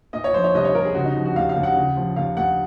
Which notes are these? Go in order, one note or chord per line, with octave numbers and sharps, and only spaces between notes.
A#2 D#5
C#5
F3 C5
C#5
C2 D#5
C#5
C2 A#4
G#4
C#3 F#4
D#4
F3
F#4
D#2 F5
F5
D#2
F#5
C#3
F3
D#2 F5
D#2 F#5